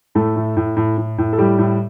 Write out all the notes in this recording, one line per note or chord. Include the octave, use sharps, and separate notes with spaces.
A2 A3 A4
A2
A2
A2
A2
A2
A4
A2 G3 G4
A2